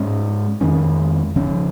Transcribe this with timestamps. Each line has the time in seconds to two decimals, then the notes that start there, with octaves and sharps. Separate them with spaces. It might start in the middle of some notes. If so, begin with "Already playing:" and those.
Already playing: G#2 G#3 C#4
0.61 F2 D#3 G#3 C#4
1.36 C#3 F3 C#4